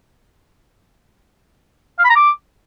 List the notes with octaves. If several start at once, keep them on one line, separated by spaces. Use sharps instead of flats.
F5
B5
A#5
D6